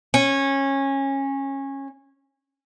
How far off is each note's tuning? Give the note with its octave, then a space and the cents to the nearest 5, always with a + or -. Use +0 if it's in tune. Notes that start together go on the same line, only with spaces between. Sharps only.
C#4 -20